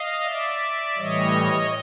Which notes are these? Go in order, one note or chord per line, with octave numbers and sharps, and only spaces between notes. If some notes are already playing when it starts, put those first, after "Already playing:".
Already playing: D#5 F5
D5 E5
A2 E3 G3 C#5 D#5